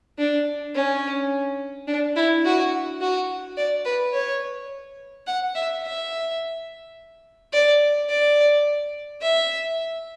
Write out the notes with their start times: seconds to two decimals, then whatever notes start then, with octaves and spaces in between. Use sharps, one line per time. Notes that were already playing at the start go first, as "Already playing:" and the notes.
0.19 D4
0.75 C#4
1.88 D4
2.16 E4
2.45 F#4
3.01 F#4
3.57 D5
3.85 B4
4.14 C#5
5.27 F#5
5.55 E5
5.83 E5
7.53 D5
8.09 D5
9.22 E5